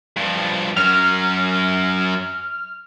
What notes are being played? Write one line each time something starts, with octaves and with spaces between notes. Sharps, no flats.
G2 F3
F#2 F#3 F6